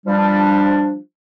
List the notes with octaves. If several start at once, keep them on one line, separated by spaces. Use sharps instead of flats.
F3 G3 D4